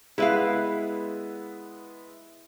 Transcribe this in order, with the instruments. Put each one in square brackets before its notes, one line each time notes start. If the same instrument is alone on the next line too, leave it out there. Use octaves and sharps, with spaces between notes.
[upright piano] G#3 B3 E5 [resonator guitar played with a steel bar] E4 B4 F5